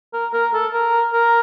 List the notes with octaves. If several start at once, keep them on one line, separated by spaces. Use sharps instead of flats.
A#4
A#4
A4
A#4
A#4